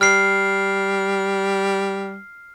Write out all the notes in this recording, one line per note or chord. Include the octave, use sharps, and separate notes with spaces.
G3 F6 C7